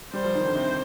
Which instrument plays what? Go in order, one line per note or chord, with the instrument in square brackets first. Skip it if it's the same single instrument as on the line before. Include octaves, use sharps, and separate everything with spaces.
[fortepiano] G3 [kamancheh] C5
[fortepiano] F3
D#3
D3
C3